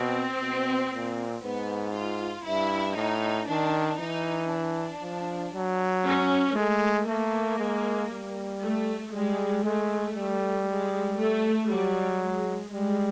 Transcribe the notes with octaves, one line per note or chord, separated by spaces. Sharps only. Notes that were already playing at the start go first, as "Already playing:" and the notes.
Already playing: B2 C4
B2
A#2
G#2 B3
F4
G2 E4
A2 D#4
D#3 D4
E3 D#4
D4
F3
F#3
C#4
G#3 A3
A3 A#3
G#3
G3
A3
G3 G#3
G#3 A3
G3
G#3
A3
F#3 G3
G#3
G3 G#3